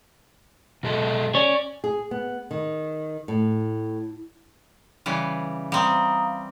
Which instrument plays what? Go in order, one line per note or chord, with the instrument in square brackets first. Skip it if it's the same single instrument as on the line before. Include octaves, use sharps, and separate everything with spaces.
[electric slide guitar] B2 G#3 A4
[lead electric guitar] C#4 C#5 [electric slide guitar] D5
[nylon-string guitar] G#4
B3
D#3
A2
[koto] C#3 E3 G3
[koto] G3 C4 [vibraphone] F5 A#5 D#6